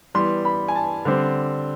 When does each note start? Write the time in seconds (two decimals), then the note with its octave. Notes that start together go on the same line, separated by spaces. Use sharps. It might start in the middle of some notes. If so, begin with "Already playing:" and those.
0.14 E3 G3 B3 C6
0.45 B5
0.68 G#5
0.75 A5
1.05 D3 G3 C4